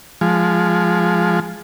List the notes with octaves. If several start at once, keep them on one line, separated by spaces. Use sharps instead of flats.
F3 G#3